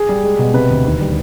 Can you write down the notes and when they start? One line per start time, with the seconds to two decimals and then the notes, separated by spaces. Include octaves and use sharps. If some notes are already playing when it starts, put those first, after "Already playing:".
Already playing: G#4
0.09 G3
0.23 G#3
0.39 B2
0.54 C3 B4
0.70 D2
0.85 D#2
1.00 G3